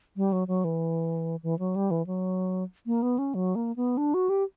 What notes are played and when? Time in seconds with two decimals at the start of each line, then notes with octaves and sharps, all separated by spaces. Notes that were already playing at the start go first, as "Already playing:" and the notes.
0.17 G3
0.33 F#3
0.48 F#3
0.65 E3
1.43 E3
1.59 F#3
1.76 G3
1.91 E3
2.07 F#3
2.86 A#3
3.02 B3
3.19 C#4
3.35 F#3
3.55 A#3
3.76 B3
3.97 D4
4.14 F#4
4.29 G4